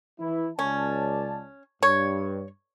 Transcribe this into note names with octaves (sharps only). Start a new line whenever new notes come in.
E3 E4
C#2 C#4 D5 A5
G2 C#5